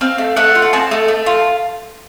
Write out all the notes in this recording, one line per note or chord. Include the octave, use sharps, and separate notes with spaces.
C4 F5
A3
A3 F#5
F4
F#5
C4 A5
A3
A3
F4